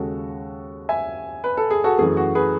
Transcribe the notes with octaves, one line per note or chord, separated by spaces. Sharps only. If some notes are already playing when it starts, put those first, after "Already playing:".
Already playing: D#2 C#3 G#3 F#4 A4
E5 G#5
B4
A4
G#4
F#4 A4
F#2 E3 A3 G#4
F#4
G#4 B4